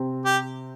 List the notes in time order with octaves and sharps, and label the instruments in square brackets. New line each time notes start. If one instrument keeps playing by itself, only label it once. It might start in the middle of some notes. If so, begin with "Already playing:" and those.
Already playing: [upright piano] C3 C4
[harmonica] G4